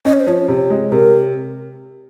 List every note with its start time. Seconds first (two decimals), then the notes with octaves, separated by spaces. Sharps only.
0.05 C#4 D#5
0.13 C#5
0.20 C5
0.27 F3 C#5
0.48 C3
0.70 G#3
0.92 C3 A#4